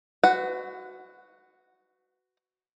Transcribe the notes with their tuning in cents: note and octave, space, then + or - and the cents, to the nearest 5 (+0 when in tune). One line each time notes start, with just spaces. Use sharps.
F#4 +0 B4 +30 F#5 +0